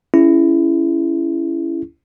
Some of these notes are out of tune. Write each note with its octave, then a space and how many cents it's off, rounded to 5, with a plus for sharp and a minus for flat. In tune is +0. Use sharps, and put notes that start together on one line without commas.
C#4 +15 E4 +15 G#4 +0